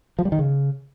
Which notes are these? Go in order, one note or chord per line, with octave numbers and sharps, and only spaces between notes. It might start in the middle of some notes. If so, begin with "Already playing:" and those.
F3
G3
D#3
C#3